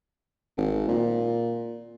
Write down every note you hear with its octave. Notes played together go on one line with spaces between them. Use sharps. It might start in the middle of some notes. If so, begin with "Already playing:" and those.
G#1
A#2